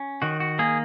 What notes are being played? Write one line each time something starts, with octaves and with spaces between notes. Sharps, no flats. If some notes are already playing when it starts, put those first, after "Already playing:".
Already playing: C#4
D#3 F#4
F#4
A#3 G#4